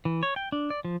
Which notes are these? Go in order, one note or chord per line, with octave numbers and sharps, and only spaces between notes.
E3
C#5
G5
D4
D5
F3